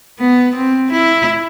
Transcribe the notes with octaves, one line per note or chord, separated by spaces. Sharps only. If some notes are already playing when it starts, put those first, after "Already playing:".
B3
C4
E4